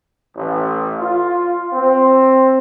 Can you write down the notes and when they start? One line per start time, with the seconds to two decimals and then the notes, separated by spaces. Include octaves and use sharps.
0.36 A1
0.99 F4
1.73 C4